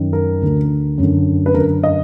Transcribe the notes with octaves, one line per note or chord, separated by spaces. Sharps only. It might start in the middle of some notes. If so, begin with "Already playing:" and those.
Already playing: F#2 D#3
A#4
D2 D3
F#2 D3
B4
F#2 D3 A#4
D#5